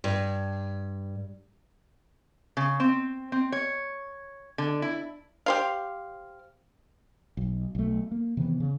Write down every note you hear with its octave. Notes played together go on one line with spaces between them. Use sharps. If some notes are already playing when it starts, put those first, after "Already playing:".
G2
C#3
C4
C4
C#5
D3
E4
G4 C5 F5
B1
B1 A3
A#3
C3 D#3 E3 B3
C#3